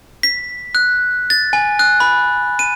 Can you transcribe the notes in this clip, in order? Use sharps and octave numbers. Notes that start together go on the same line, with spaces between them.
B6
F#6
A6
G#5
F#6
B5
D#7